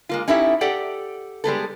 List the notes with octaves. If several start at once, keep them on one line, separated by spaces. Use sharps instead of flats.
G#3 A#3 F4
C#4 D#4 E4 G4 A4 E5
G4 A4 D5 F#5 G5
G3 G#3 B3 A4